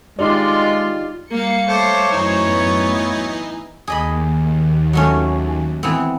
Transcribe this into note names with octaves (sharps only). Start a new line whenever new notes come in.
G#3 D#4 F4 G4 D5 C6
G3 A#3 F5 C#7
A3 C5 C#5 F5 D6
F#2 A2 E3 D#4
B3
D#2 G#4 D#5 B5
F#3 A3 C#4
E3 B3 C4